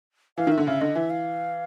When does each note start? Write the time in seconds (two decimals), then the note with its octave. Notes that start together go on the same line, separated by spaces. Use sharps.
0.38 E3 F5
0.47 D#3
0.52 E5
0.57 D3
0.67 C#3 E5
0.81 D3 D#5
0.95 E3 E5
1.10 F5